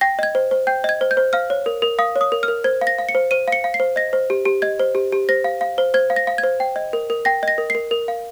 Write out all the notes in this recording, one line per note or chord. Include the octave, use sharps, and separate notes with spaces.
G5 A#6
D#5 G#6
C5
C5
G5 G6
D#5 G#6
C5
G6
C5
F5 F6
C#5
A#4
A#4
F5 D#6
C#5
D#6
A#4
F6
A#4
C5 G#6
F5
A#6
F5
C#7
C5
C5 D#7
F5 C#7
F5
C7
C5
D#5 A#6
C5
G4
G4
D#5 G#6
C5
G4
G4
C5 A#6
F5
F5
C5
C5 G#6
F5
A#6
F5
G#6
C5
G5
D#5
A#4
A#4
G5 A#6
D#5 A#6
A#4
C7
A#4
A#4
F5